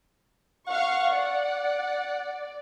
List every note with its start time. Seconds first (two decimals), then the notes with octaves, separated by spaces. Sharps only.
0.67 F5 F#5 C#6
1.12 D5